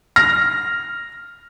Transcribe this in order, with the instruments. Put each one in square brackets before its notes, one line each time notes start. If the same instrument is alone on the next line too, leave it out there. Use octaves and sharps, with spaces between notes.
[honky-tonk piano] F6 A#6